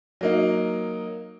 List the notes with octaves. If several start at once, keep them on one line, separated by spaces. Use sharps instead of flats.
F#3 A#3 D#4